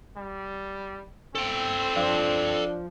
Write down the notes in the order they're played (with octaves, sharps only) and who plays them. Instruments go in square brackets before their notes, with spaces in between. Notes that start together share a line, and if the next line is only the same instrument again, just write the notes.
[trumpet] G3
[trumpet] C4 [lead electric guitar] A4 G5
[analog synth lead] F3 [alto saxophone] D4